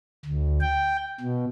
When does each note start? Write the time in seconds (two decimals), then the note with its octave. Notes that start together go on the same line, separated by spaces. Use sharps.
0.25 D2
0.61 G5
1.21 B2